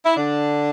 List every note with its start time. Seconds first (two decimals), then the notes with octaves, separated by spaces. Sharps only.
0.04 E4
0.16 D3 D4